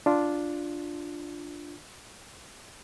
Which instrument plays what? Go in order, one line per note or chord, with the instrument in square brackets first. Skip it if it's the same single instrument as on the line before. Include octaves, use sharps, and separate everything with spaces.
[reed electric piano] D4 F4